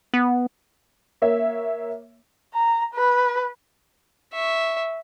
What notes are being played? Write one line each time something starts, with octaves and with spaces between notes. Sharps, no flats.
B3
A#3 C#5 E5
A#5
B4
E5 C#6